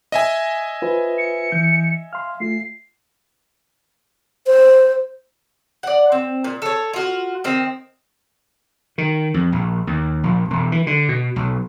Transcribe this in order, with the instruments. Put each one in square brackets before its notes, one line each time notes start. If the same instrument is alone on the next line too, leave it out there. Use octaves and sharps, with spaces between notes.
[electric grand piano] D#5 E5 G#5
[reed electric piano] F4 B4 C5
[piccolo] C#7
[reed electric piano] E3 G6
[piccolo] F5 [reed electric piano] C6 F6
[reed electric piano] A3 F4 [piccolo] C7
[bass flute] C5
[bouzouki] D5 F#5
C4
A#2
A4 C#5
F4 F#4
D#3 C4
[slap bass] D#3
F2
A#1
D#2
A#1
E1
E3
D3
B2
B1